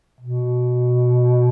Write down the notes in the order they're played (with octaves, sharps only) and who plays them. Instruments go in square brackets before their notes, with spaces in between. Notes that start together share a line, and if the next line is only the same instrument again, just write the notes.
[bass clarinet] B2